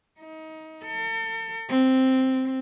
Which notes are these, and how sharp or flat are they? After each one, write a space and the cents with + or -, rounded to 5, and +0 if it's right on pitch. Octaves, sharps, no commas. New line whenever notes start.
D#4 +25
A4 +40
C4 +0